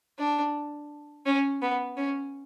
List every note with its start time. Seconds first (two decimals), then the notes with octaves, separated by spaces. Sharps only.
0.19 D4
1.26 C#4
1.62 B3
1.97 C#4